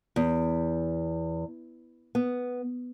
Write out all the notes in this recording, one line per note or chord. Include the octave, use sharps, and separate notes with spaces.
E2
B3